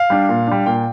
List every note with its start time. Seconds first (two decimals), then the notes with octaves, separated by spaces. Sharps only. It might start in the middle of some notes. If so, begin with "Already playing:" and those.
Already playing: F5
0.10 G3 D4
0.29 A#2
0.47 G3 D4
0.66 A#2 G5